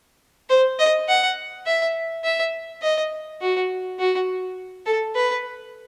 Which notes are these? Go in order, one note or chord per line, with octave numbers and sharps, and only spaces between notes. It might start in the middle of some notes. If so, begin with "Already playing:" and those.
C5
D#5
F#5
E5
E5
D#5
F#4
F#4
A4
B4